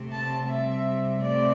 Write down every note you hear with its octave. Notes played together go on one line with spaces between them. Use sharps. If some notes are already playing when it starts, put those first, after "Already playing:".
Already playing: C3 A3 C4
A5
C3 G3 C4 E5
C3 A3 C4 D5